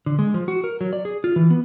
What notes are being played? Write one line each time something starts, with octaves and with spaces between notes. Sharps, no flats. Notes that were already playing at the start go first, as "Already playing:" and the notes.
D3
G#3
F3
F#4
A#4
F#3
D5
G#4
F4
E3
B3